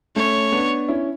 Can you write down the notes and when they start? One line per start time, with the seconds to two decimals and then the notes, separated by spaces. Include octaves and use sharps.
0.16 A3 C#4 C#5
0.52 B3 D4
0.88 C#4 E4